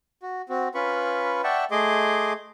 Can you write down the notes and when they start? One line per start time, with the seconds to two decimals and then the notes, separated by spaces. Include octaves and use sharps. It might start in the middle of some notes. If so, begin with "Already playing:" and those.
0.23 F#4
0.49 C4 F#4
0.75 C#4 F4 B4 B5 C#6
1.44 D5 E5 F#5 G5 A5 C#6
1.71 A3 G#4 D#5 C6 D6